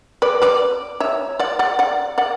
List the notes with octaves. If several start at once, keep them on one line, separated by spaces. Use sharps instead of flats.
B4 D5
B4 D5
C#5 E5
D5 F#5
D5 F#5
D5 F#5
D5 F#5